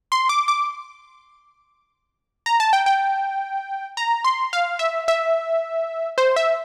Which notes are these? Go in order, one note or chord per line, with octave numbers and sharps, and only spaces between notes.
C6
D6
D6
A#5
A5
G5
G5
A#5
C6
F5
E5
E5
C5
E5